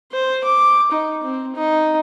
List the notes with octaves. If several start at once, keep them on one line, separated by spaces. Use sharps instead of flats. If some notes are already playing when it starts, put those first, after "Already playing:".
C5
D6
D#4
C4
D#4